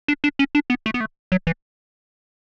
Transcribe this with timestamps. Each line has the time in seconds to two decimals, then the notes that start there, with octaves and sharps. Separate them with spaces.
0.08 D4
0.24 D4
0.39 C#4
0.55 D4
0.70 B3
0.86 A3
0.94 B3
1.01 A3
1.32 F#3
1.47 E3